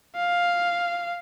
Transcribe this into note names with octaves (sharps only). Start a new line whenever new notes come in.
F5